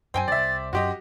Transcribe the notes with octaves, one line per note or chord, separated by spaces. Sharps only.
F#2 C4 G5 G#5
C2 D5 E5 A6
F#2 F#4 G4 D#5 C6